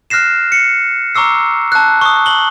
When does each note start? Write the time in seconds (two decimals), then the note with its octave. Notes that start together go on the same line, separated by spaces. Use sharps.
0.10 F6 F#6 A#6 C7 E7
0.52 C#7
1.15 A#5 C#6 D6 E6 C7
1.72 A5 F#6
2.01 C#6 D#6
2.26 F#7 G7